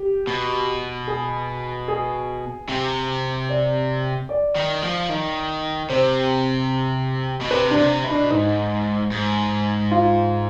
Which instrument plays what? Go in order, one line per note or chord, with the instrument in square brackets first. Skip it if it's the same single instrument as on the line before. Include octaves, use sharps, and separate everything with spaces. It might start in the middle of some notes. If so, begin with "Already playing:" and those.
Already playing: [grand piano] G4
[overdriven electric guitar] B2
[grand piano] G#4
G#4
[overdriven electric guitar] C3
[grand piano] D5
D5
[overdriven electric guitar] D#3
F3
D#3
[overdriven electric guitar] C3 [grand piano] C5
[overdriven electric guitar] B2
[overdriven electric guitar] C3 [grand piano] B4
[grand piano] D4
[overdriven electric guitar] C3
B2
[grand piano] D4
[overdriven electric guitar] G#2 [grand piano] D#4
[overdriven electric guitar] G#2
[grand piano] F4